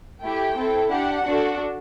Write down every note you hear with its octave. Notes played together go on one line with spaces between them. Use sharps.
A3 E4 G4 G5
C4 E4 A4
D4 G4 F#5
D4 F#4 A4